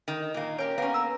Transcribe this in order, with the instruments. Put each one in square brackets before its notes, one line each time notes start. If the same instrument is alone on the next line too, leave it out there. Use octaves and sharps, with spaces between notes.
[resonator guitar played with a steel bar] D#3
[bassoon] D#4
[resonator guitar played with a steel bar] A#2 A#3
[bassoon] C#4 [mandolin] G4 A#4 G5
[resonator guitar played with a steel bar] A#3 C#4 [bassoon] B3
[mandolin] A#5 E6